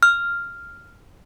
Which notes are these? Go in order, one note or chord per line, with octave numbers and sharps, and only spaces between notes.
F6